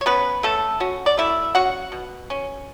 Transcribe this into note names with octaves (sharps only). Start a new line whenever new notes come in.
C#5
B3 C#4 B4
A3 C#4 A4
C#4 F#4
D5
A3 E4 E5
C#4 F#4 F#5
B2
C#4